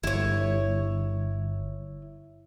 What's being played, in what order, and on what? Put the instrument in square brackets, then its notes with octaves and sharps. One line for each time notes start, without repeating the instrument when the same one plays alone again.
[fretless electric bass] G1 [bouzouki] E4 C#5